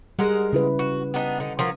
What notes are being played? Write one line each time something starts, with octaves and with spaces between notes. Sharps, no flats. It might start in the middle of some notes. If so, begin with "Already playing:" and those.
G3 G#3 A#4 F#5
C#3 E4 B4
F#4
B3 D4 D#4
D3 D#4
F3 F#3 A#3